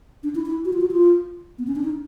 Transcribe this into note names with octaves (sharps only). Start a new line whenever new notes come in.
D4
E4
E4
F#4
F4
F#4
F4
B3
C#4
D4
D#4